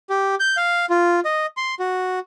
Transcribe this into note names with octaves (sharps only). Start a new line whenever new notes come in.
G4
G6
F5
F4
D#5
C6
F#4